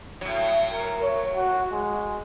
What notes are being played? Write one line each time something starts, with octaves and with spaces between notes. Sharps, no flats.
A2 F#3
A#4
C#5
F#4
G#3